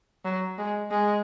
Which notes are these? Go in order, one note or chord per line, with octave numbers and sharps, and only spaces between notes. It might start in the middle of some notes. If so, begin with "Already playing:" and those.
F#3
G#3
G#3